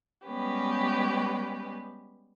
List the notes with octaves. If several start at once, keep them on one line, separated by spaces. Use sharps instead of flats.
G3 G#3 B3 C#4 G4 B4